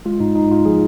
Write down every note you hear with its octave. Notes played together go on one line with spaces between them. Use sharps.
G#3 F4
G#2 D#4
G#2 D#4
G#2 F4
F3 G#4